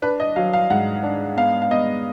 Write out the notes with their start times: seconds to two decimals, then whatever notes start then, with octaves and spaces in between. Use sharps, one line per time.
0.02 D4 B4
0.20 D#5
0.36 F#3 F5
0.53 F5
0.70 G#2 F#5
1.03 D4
1.36 B3 F5
1.62 F5
1.71 B3 D#5